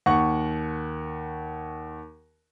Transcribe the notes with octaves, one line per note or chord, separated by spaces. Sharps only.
D#2 F#5 C#6